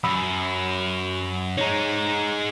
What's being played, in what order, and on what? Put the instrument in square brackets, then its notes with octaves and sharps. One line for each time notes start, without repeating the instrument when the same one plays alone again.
[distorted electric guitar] F#2 [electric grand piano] B5 D#6 E6
[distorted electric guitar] G#3 D#4 [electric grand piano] C#5 A#5